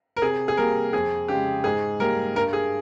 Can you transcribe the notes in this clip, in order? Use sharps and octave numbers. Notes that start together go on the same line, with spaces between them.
A#4
C3 G#4
G#4
G3 A#3 A#4
F2 G#4
C#3 G#3 G4
G#2 G#4
G3 A#3 A#4
G2 A#4
G#4